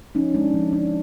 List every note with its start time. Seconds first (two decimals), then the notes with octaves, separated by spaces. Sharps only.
0.15 F3 C#4 D#4
0.34 G#3 D4
0.54 F3 C#4
0.73 C#4 D4